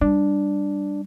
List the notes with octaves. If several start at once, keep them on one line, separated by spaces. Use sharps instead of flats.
G3 D4